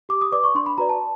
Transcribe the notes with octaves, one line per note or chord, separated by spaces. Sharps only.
G4 D6
D#6
B4 D5 D6
C#6
D4 C6
B5
F#4 B4 D5 A#5
A5